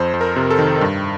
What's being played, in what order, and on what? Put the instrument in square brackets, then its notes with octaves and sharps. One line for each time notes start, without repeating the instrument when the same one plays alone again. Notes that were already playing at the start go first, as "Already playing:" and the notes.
Already playing: [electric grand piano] F2 C5
F2
A#4
C3
A4
D#3
G2